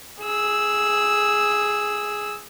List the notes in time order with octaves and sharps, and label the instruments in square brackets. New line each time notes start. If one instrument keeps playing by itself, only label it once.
[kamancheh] G#4 E6